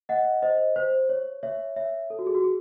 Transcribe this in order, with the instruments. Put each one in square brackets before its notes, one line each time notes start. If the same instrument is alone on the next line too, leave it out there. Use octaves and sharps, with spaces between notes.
[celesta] D#5 F#5
C5 D#5
C5
C#5
C#5 E5
C#5 E5
A4
F#4
G#4
F#4
G#4